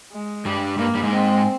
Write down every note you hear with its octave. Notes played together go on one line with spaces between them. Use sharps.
G#3
G2 G3
G2 G3 A#3
G2 G3
G#2 G#3
C4